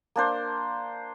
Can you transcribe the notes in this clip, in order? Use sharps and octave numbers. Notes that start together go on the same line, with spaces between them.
A#3 D4 C5